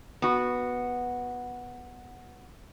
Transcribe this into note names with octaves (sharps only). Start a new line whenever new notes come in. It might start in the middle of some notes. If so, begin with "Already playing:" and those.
B3 F#4